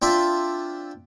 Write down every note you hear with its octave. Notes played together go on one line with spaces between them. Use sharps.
C4 D4 F4 E5